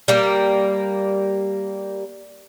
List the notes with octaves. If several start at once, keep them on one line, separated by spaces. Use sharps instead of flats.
G3 A#3